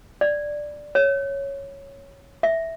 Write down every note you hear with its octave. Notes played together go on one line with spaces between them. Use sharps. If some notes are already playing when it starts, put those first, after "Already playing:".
D5
C#5
E5